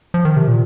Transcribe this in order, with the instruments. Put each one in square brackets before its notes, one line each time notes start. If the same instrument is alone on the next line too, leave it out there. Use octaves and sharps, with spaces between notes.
[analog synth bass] F3
D#3
C3
A#2